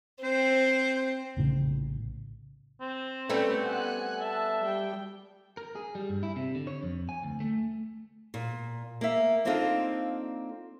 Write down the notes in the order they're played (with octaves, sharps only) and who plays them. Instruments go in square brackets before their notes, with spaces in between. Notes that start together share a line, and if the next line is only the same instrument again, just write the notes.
[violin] C4 [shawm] C5
[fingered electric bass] A#1 A2 C#3
[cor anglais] C4
[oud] G3 A3 B3 [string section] C#4
[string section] F#5 G#5 F#6
[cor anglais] E5 [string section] A5
[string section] G3 G5
[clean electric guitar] A#4
G#4
G3
G2
E4
C3
D3
C#5
F2
G#5
D2
A3
[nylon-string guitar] A#2
A#3 E5
A#3 C4 D4 D#4 F4 A4